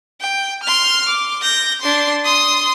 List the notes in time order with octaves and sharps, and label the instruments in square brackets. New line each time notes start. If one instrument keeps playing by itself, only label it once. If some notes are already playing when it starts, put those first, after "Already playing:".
[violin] G5
C6 F6
D6
G6 A#6
D4 C6
C6 D#6